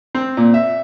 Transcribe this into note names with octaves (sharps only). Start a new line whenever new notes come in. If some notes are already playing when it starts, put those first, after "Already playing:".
C4
A#2
E5